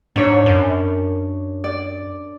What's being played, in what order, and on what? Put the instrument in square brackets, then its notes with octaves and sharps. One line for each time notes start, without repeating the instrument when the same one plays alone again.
[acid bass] G#2 [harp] D4 C#5
[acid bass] F#2
[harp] D5